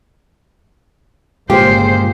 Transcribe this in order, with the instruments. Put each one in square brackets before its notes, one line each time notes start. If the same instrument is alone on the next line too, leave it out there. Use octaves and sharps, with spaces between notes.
[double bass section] G1 A#2 C#3 [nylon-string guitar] G#3 A#3 F4 [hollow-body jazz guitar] G4 [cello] C5